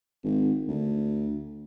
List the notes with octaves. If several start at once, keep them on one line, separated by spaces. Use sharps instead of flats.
G#1
D2